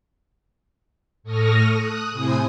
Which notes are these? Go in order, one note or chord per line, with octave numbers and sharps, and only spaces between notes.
A2 A4 C#6 D#6 F6 A#6
D#6 F#6
A2 C3 E4 C5 G#5 D#6